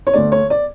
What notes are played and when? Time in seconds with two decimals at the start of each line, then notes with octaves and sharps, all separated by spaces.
0.07 C#5
0.14 D2 D3 A3 D5
0.32 C#5
0.50 D5